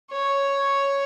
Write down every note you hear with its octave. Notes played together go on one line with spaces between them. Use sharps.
C#5